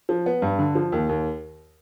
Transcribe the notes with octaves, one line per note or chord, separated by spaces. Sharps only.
F3
B3
G2
D3
F3
D#2
D#2